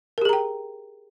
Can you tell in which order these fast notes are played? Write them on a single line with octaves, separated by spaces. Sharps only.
A#4 G4 G#4 A#5 G5